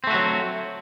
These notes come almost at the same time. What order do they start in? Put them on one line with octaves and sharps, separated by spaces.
C4 A3 F#4 F#3